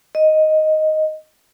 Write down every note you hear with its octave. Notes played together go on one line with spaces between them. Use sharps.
D#5